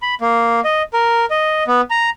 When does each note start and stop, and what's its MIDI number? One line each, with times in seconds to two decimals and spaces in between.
0.02 0.14 83
0.21 0.61 58
0.64 0.82 75
0.94 1.25 70
1.30 1.64 75
1.67 1.81 59
1.90 2.10 82